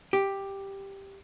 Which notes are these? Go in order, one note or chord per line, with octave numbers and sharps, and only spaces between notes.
G4